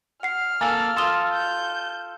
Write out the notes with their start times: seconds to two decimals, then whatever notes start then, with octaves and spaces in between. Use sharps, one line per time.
0.23 F#5 F6 C7
0.61 A#3 A4 G#5 A6
0.97 F4 A4 C6 D#6 G7
1.33 G6